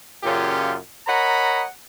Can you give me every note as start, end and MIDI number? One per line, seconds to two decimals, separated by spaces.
0.24 0.76 42
0.24 0.76 46
0.24 0.76 49
0.24 0.76 61
0.24 0.76 65
0.24 0.76 67
1.07 1.64 70
1.07 1.64 73
1.07 1.64 75
1.07 1.64 78
1.07 1.64 82
1.07 1.64 83